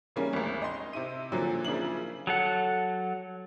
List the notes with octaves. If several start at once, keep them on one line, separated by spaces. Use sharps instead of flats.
C#3 E3 G3 A#3 C#4
G#1 D2
D#5 C6
C3 E4 D#7
A#2 D3 F3 F#3
C#3 F3 A#3 D4 E4 F#7
F#3 A4 F#5